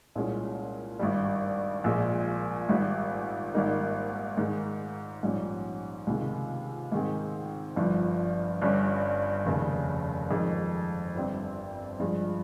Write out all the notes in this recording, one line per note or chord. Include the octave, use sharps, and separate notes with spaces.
C2 A#2 G#3 C#4
G#1 G2 G3
A#1 A#2 G#3
G#1 G#2 G3
G#1 G#2 G3 A#3 D#4
G#2 D#3 G#3 D#4
A#1 G#2 G3 C#4
C#2 C3 D#3 G#3
G#2 D#3 G#3 C4
G1 G2 F3
G1 G2 G3 C#4
F1 D#2 C#3
F2 D#3 G#3
G1 G2 G3 C4
G2 F3 G#3